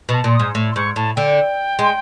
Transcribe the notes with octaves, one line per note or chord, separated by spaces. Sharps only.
B2 A5
A#2
D#6
G#2
A2
C6
G#2 C#6
A2 A5
D3 G5
G#3